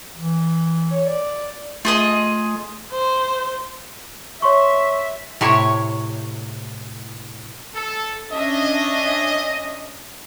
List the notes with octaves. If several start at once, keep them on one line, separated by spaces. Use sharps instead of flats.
E3
C#5
D5
A3 F4 G#4 D#5
C5
C#5 E5 C6 C#6
A2 C3 C#5
A4
C#4 D4 D#5 E5